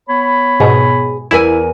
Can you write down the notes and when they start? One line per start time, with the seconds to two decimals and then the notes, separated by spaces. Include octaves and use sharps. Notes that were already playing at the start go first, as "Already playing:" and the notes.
0.08 B3 C#5 B5
0.60 G#2 B2 G#4
1.31 E2 E4 A#4 G#5